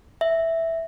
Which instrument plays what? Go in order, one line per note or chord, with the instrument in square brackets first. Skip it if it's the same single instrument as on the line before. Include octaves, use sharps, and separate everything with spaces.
[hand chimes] E5